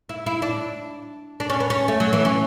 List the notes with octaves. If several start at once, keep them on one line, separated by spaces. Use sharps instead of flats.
E4
E4
D4
D4
C#4
B3
C#4
A3
F#3
E3
C#4